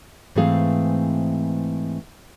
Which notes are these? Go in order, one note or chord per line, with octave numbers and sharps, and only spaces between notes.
G#2 E3 A3 C4 G#4 F5